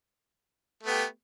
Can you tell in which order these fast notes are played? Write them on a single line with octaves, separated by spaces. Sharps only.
A3 B3 G4